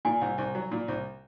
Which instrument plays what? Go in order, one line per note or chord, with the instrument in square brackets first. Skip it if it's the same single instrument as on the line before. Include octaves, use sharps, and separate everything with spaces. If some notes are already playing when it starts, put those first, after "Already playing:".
[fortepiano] A#2 [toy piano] G#5
[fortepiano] C2
C2
F#3
A#2
C2